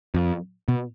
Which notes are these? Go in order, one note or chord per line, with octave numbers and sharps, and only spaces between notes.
F2
B2